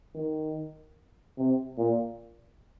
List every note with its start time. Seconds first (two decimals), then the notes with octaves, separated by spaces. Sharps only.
0.15 D#3
1.38 C3
1.78 A#2